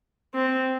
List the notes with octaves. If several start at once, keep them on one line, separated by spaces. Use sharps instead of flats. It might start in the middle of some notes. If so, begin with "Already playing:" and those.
C4